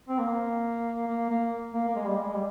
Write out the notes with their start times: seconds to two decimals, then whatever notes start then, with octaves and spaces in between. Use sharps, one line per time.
0.09 C4
0.19 A#3
1.07 A#3
1.30 A#3
1.74 A#3
1.88 A#3
1.96 G#3
2.06 G3
2.17 G#3
2.28 G#3
2.34 G3